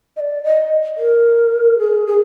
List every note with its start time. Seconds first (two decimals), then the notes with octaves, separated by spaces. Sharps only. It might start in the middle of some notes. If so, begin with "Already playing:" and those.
0.16 D#5
0.20 D5
0.43 D#5
0.97 A#4
1.79 G#4
2.06 G#4